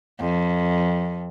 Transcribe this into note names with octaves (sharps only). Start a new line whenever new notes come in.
F2